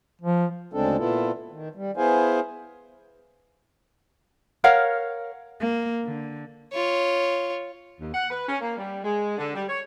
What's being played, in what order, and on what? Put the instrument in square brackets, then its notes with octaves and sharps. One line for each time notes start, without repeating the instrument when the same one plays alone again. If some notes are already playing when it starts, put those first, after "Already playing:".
[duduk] F3
[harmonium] D2 C#3 G#3 C4 D4 A4
A#2 B3 E4 F4 A4
D#3
G3
B3 E4 G#4 C5 F5 G#5
[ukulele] A#4 C#5 F5 F#5
[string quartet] A#3
D3
[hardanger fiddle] F4 C#5
[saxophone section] D#2
F#5
B4
C#4
A#3
G3
G#3
D3
G3
C#5